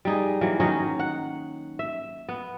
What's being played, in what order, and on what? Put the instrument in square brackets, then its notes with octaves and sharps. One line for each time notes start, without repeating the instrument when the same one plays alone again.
[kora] G3 D#4 G#4
E3 F#3 A#3
D#3 F#3 C#4 D#4
F#5
E5
B3